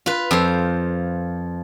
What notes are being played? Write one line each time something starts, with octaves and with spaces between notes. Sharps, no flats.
F4 B4
F2 C5